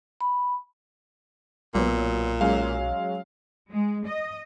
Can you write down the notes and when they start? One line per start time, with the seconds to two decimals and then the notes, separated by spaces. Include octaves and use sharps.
0.21 B5
1.75 B1 A#2 F#3 B3
2.41 F#3 G#3 C#4 F5
3.73 G#3
4.06 D#5